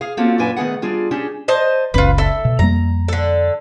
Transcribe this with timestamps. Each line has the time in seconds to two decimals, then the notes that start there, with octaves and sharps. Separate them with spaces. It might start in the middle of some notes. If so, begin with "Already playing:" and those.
0.01 G#4 F5
0.17 A#3 C4 C#4 F4 F#4 A4
0.38 F#2 A#2 D4 B4 G#5
0.56 D#3 A3 B3 G#4 F#5
0.82 G3 D4 F4 G#4
1.11 C#4 D4 G4 G#4
1.48 C5 D#5 A5
1.94 F#1 C#2 C#4 F4 B4
2.18 A4 E5
2.45 B2
2.59 F2 G3 A#3 A#5
3.08 D3 A4